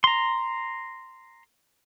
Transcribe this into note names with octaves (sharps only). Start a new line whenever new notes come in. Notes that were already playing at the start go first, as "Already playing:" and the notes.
A#5 C6